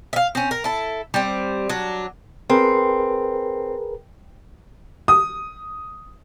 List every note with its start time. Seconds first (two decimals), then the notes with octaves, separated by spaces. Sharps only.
0.13 E5 F5
0.35 C4 C#4
0.51 A#4
0.64 E4 A4
1.14 G3 C4
1.69 F#3 D4
2.50 C4 G#4 A#4 B4
5.08 D#6